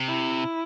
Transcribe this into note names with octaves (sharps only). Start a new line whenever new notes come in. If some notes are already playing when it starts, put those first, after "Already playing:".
Already playing: C3
E4